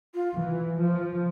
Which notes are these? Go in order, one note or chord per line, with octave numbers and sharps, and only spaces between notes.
F4
E3
F3